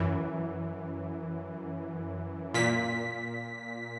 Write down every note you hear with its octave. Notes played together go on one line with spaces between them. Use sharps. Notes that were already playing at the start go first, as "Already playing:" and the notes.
Already playing: F#2 E3
A#2 B6